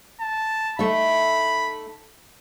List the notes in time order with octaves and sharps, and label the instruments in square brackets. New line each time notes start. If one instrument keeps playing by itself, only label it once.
[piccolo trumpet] A5
[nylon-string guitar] A3 D#4 E5 [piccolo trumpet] B5